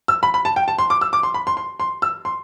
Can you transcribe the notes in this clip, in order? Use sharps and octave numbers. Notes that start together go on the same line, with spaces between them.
E6
B5
B5
A5
G5
A5
C6
D6
E6
D6
C6
B5
C6
C6
C6
E6
C6